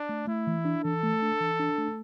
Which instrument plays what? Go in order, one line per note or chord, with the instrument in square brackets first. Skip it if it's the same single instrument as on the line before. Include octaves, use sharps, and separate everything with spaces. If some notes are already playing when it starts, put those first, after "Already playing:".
Already playing: [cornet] D4
[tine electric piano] A3
[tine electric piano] A3 [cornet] E4
[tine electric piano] E3
D4
[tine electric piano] E3 [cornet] A4
[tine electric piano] A3
D4
E3
D4
A3